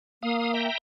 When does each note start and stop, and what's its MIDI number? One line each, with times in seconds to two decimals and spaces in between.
0.23 0.68 58
0.23 0.53 77
0.23 0.53 87
0.54 0.78 76
0.54 0.78 79
0.54 0.78 82